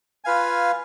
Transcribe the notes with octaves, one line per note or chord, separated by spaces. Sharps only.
F4 B4 F5 G#5